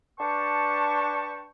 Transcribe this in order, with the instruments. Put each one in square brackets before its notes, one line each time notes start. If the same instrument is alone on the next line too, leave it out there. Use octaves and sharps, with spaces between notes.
[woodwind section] D4 B4 G5 A5 C#6